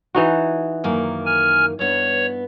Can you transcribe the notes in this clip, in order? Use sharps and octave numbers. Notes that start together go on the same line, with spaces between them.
E3 D#4 F#4
F#2 D#3 A#3
G#5 F6
G2 B3 C#5